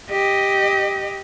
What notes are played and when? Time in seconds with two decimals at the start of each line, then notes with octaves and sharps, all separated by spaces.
0.11 G4 D#5